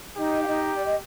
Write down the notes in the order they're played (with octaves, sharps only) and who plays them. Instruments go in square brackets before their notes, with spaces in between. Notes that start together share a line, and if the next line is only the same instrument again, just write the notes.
[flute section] D#4 D#5 [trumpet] G4
[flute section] F5
D#4 D#5
D5
D#5